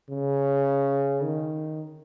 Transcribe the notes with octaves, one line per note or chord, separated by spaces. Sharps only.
C#3
D#3